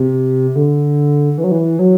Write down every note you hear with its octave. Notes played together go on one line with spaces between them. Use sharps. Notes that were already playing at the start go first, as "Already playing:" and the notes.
Already playing: C3
D3
E3
F#3
E3
F#3